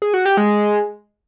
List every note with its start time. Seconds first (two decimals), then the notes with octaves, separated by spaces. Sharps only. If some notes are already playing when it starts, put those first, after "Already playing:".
0.02 G#4
0.14 F#4
0.25 G4
0.37 G#3